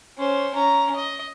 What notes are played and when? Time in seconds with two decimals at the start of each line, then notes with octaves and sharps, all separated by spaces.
0.18 C#4 C5
0.55 C#4 A#5
0.95 D#5